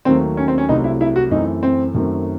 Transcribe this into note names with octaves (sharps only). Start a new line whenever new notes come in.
D#2 D#3 F#3 A3 C4
C#4
C4
C#4
C2 C3 F#3 A3 C4 D#4
E4
E4
F#4
F#2 E3 A3 C4 D#4
C4
F#2 D#3 F#3 A3 C4